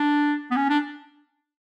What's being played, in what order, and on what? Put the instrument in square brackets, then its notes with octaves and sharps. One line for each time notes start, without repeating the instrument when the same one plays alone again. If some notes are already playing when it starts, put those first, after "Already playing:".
Already playing: [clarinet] D4
B3
C#4
D4